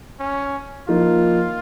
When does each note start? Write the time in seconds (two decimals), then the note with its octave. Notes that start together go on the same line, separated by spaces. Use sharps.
0.20 C#4
0.88 F3 A#3 D#4 F4